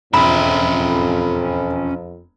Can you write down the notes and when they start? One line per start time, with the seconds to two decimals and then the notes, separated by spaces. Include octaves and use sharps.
0.14 E1 F2 C#4 E5 B5